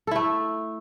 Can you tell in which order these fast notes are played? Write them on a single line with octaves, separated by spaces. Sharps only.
A4 E4 A3